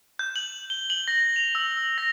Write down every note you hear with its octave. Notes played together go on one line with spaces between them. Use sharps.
G6
F#7
G7
F#7
A#6
F7
E6
E6
A#6